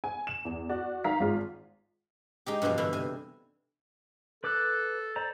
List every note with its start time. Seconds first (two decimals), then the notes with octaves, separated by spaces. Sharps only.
0.04 G#5
0.27 E7
0.45 E2
0.69 F#4 D5
1.04 D#3 F5 A#5 B6
1.20 G#1 G#3 F4
2.46 G#3 D#4 G4
2.62 G2 B2 E3 F3 G#3
2.78 B2 D3 E3 E4
2.93 C3 G#5
4.44 A4 B4 D6 F#6
5.16 C5 D5 A#5